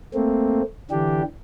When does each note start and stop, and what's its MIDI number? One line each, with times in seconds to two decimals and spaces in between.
0.14 0.62 57
0.14 0.62 58
0.14 0.62 60
0.91 1.23 50
0.91 1.23 52
0.91 1.23 62
0.91 1.23 67